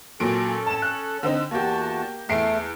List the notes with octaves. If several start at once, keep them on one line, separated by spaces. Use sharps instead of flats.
A#2 F#3 C#4 A4 D7
A5 E7
F#6
D3 C4 D#4
E2 A#3 F#4 G4 A5
E2 A3 C7 D7